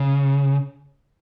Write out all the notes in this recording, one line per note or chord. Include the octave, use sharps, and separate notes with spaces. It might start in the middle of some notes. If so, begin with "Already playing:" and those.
Already playing: C#3